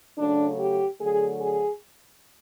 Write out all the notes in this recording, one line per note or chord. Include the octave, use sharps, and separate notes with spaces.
C#3 F#3 A3 D4
G4
D3 F#3 A3 G#4
G#4